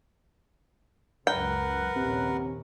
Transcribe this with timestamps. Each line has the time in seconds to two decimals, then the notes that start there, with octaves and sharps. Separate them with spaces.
1.27 C#2 F#2 A#4 B4 F#5 G5
1.96 A#1 D#2 C3 C#4